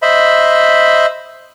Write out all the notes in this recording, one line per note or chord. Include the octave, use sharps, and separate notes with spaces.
C5 D#5 E5 B5